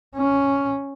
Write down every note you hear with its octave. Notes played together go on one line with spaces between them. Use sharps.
C#4